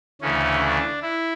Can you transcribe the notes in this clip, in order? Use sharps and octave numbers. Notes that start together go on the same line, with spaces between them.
D2 C#3 E3 A3 C#4
D4
E4